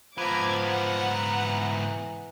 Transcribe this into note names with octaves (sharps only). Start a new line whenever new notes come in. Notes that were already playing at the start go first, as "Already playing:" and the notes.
G#2 F3 B3 A#5 D6 G#6
F#5 A#5
E3